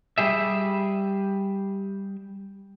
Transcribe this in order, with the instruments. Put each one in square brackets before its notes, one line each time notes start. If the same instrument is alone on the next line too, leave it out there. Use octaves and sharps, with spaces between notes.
[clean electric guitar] G3 G4 G#4 E5